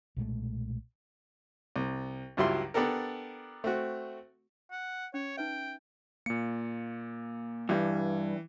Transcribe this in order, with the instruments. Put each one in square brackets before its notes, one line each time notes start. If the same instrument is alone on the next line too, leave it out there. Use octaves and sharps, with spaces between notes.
[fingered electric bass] B1 A#2 G#3 A3
[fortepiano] C2
C#2 G2 F#3 E4 F4 C6
B3 D4 G4 A4 A#4
A3 C4 F#4
[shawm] F#5
[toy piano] C#4 [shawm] C#5
[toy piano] D#4 B4 E5 [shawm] G5
[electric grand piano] A#2 C#7 [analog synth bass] A#3
[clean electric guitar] G2 [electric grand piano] E3